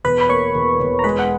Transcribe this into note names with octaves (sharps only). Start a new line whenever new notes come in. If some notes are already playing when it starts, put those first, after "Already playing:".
E1 B4 B5
B5
A#3 C#5 C#6
E1
E1
A#5
G#3 B4 B5
F#5